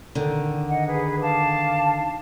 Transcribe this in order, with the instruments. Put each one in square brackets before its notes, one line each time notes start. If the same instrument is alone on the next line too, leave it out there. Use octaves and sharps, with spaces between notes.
[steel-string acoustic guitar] D3 D#3
[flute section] D#5 F#5
G#4 B4
F5 A5 D6